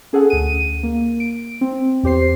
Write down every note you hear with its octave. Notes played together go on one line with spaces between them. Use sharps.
C#4 G#4 A4 F#5
D2 D#7
A#3
D7
C4
E2 G4 C5 C7